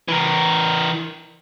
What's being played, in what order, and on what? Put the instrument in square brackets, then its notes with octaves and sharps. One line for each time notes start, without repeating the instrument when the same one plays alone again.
[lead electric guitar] E3 A#4